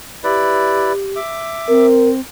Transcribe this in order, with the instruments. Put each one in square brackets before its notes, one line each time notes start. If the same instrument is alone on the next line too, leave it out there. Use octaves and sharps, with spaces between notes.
[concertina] E4 B4 D5 [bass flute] G4
[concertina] E5 D6
[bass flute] C4 [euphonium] A#4